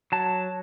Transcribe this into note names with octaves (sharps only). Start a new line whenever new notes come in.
F#3 A5